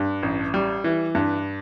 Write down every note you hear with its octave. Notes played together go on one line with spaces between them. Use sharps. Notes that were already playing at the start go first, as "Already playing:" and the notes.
Already playing: G2
A1
G3
E3
G2